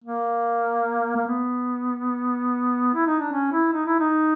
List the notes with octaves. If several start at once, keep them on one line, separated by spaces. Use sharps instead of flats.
A#3
A#3
B3
E4
D#4
D4
C#4
E4
D#4
E4
D#4